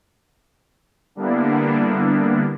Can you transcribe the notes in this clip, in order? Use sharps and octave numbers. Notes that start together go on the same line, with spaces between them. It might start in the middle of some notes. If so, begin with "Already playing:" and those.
D3 G3 A#3 B3 D4 E4